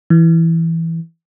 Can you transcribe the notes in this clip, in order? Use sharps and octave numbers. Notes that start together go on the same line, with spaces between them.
E3